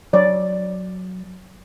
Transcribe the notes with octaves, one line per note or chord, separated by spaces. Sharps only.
F#3 C#5 D5